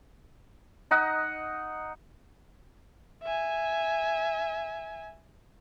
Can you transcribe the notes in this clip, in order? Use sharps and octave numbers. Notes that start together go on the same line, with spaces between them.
D#4 D#5 F#5
E5 G#5